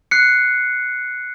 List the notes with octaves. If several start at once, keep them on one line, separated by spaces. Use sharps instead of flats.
F#6 C7 C#7